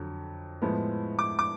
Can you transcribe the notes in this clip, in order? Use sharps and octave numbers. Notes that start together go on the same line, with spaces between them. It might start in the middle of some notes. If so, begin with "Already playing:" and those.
Already playing: F2 D3 F#3
A2 F3 G#3 B3
D6
D6